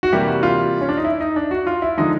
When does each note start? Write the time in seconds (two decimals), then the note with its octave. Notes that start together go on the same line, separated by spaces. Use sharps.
0.03 F#4
0.12 C3 E3 G3 A#3 G4
0.28 F#4
0.43 F4
0.81 C#4
0.89 D4
0.97 D#4
1.05 E4
1.20 D#4
1.36 D4
1.51 F#4
1.67 F4
1.82 E4
1.97 D3 F3 G#3 D#4